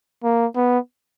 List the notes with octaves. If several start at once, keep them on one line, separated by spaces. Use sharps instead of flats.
A#3
B3